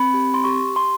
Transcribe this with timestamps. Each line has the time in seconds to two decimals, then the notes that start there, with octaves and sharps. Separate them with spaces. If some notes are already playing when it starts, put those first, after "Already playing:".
Already playing: C4 B5
0.14 G4
0.34 C6
0.44 G4 C#6
0.76 G4 C6